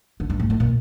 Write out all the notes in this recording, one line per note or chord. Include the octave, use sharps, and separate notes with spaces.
D3
G2
A2
A2
A#2